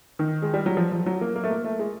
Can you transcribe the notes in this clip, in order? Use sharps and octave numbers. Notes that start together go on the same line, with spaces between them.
D#3
G#3
G3
F#3
F3
F3
F#3
A#3
A#3
A3
A#3
A3
G#3